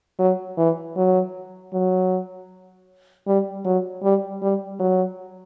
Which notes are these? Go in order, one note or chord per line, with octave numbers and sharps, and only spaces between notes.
F#3
E3
F#3
F#3
G3
F#3
G3
G3
F#3